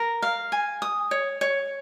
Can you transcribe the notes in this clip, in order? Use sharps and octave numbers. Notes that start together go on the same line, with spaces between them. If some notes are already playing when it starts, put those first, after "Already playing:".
Already playing: A#4
F5
G#5
D#6
C#5
C#5